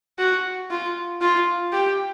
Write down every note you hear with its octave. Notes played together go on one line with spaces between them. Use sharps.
F#4
F4
F4
G4